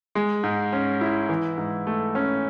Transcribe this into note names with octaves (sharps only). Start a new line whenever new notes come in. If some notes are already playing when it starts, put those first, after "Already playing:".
G#3
G#2
C#4
E4
E3
G#2
A3
C#4